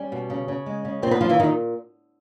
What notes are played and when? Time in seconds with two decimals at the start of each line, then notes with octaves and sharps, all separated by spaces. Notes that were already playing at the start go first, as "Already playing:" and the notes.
Already playing: G3 C#4
0.12 B2
0.30 C#3
0.48 C#3
0.66 G#3
0.85 C#3
1.02 A#2 C4 C5
1.11 B3 B4
1.21 A#2 F3 F4
1.29 E3 E4
1.39 A#2 D#3 D#4